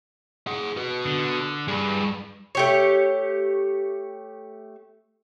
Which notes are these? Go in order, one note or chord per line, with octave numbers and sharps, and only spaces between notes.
G#4 F#5
F#4 B4
D3
G2 G#4 B4
A3 G4 C#5